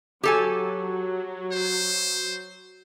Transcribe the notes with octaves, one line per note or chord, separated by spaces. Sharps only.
F#3 G4 A4 G#5
C5